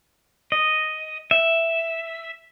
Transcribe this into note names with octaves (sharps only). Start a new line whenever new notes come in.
D#5
E5